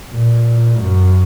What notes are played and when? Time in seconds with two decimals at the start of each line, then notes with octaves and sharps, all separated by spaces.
0.11 A#2
0.78 F#2